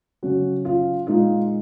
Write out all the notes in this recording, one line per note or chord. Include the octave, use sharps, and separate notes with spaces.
C#3 F#3 C#4 F#4
F4
A#2 G#3 D#4 F4